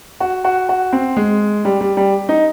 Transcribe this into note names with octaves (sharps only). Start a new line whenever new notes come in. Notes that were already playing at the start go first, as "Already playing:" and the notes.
F#4
F#4
F#4
C4
G#3
G3
G3
G3
D#4